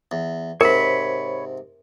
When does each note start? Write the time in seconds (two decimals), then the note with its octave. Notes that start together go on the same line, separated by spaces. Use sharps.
0.11 E2
0.61 G#2 C3 A#4 C#5 B5